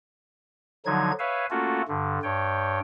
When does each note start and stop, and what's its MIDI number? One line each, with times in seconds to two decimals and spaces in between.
0.86 1.12 50
0.86 1.12 53
0.86 1.12 54
0.86 1.12 63
0.86 1.12 92
1.19 1.46 71
1.19 1.46 73
1.19 1.46 76
1.19 1.46 77
1.19 1.46 80
1.50 1.82 57
1.50 1.82 58
1.50 1.82 61
1.50 1.82 65
1.50 1.82 66
1.50 1.82 69
1.88 2.19 43
1.88 2.19 50
2.23 2.80 43
2.23 2.80 73
2.23 2.80 79